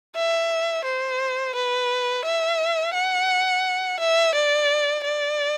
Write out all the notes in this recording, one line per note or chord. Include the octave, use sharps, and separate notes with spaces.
E5
C5
B4
E5
F#5
E5
D5
D5